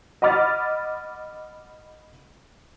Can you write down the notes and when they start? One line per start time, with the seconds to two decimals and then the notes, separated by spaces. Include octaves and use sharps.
0.22 D#5 F#5 B5 D6 F6 A6